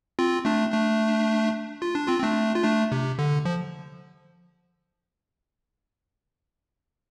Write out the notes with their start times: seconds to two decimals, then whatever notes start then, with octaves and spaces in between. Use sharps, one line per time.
0.19 C4 F4
0.45 A3 D4
0.72 A3 D4
1.82 F4
1.95 D4
2.08 C4 F4
2.19 C4
2.23 A3 D4
2.55 F4
2.64 A3 D4
2.92 C3
3.19 D3
3.45 F3